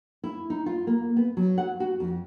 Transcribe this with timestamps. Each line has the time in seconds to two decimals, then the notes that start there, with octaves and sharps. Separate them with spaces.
0.24 E4
0.50 D#4
0.66 F4
0.87 A#3
1.17 B3
1.37 F#3
1.58 F#5
1.80 F#4
2.00 F2